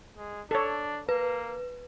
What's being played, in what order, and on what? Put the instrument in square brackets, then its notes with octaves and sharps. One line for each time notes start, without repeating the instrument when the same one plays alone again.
[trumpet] G#3
[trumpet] D4 [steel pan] A4 C#5
[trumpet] A#3 [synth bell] B4